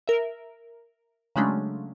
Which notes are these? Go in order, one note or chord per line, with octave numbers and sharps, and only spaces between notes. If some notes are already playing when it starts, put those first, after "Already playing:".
A#4 E5
C#3 F#3 G#3 A3 C#4 D4